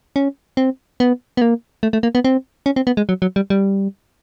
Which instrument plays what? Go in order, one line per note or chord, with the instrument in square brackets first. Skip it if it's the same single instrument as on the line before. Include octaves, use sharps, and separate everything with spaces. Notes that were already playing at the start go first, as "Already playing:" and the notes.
[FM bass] C#4
C4
B3
B3
A#3
A3
A3
A#3
B3
C4
C#4
C4
B3
G#3
F#3
F#3
G3
G3